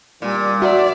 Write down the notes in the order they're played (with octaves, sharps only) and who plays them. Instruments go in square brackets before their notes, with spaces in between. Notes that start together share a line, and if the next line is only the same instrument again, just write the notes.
[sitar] A#2 [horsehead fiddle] G3
[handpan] F#4 [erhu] D5 [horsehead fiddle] E5